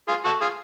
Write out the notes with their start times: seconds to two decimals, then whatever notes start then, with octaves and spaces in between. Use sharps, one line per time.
0.08 F4 G#4
0.25 F#4 A4
0.41 F4 G#4